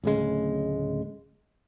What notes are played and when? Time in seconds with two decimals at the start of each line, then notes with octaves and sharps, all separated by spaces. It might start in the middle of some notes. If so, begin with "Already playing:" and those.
0.04 D1 A2 C#3 G#3